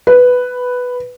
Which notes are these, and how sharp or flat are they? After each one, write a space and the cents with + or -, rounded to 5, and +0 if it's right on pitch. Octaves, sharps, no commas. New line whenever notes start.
B4 +5